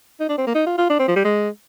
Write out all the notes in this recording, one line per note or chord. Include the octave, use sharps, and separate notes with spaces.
D#4
D4
C4
A#3
D#4
F4
F4
D4
C4
F3
G3
G#3